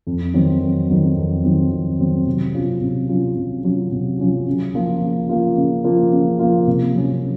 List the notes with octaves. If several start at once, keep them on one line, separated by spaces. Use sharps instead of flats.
F2
D#3 F#3 C4
F2
D#3 F#3 C4
F2
D#3 F#3 C4
F2
D#3 F#3 C4
C3
F#3 C#4 F4
C3
F#3 C#4 F4
C3
F#3 C#4 F4
C3
F#3 C#4 F4
C#3
F3 A#3 F4
C#3
F3 A#3 F4
C#3
F3 A#3 F4
C#3
F3 A#3 F4
C3
F#3 C#4